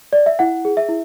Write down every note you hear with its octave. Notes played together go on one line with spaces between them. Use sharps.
D5
E5
E4 F#5
G#4
E5
E4